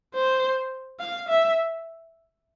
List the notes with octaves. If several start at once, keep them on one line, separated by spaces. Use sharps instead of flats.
C5
F5
E5